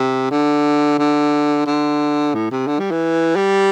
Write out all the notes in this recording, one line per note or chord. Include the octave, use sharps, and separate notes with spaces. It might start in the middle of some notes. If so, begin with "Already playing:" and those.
Already playing: C3
D3
D3
D3
A2
C3
D3
G3
E3
G3